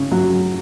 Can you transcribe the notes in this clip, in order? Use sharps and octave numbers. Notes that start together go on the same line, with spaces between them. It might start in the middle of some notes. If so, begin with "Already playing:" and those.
Already playing: C#3
F#3